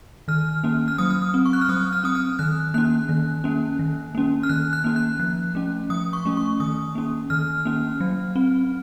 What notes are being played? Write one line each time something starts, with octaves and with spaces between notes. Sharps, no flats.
D#3 F6
A#3 C#4
F6
F#3 D#6
F6
D#6
C4
C#6
F#6
F6
F#3 D#6
F6
C4 D#6
F6
D#3 F#6
A#3 C#4 F#6
D#3
A#3 C#4
D#3
A#3 C#4
F6
D#3 F#6
F#6
A#3 C#4
F#6
F3 F#6
A3 C#4
F3 D#6
C#6
A3 C#4
C#6
D#3 D#6
A#3 C#4
D#3 F6
A#3 C#4
F#3
C4